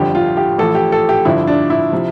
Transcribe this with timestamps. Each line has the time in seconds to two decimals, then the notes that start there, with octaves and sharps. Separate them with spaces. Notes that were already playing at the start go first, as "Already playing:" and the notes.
Already playing: G1 F2 D3 G4
0.15 F4
0.37 G4
0.59 A1 A2 F3 A4
0.75 G4
0.92 A4
1.09 G4
1.25 G1 F2 D3 F3 E4
1.47 D4
1.70 E4
1.92 C3 F3